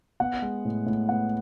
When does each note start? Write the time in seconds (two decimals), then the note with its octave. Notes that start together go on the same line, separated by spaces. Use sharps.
0.20 B3 F#5
0.42 G#3
0.65 A2
0.86 A2
1.09 B3 F#5